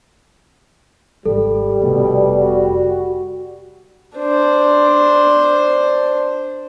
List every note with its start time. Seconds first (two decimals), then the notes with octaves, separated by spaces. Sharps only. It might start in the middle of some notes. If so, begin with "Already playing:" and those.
1.25 G#1 G3 A4
1.82 F1 B2
2.38 F#4
4.18 D4 C5